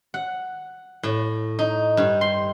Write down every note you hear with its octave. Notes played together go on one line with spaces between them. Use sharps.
F#5
A2
D#4
G2
C6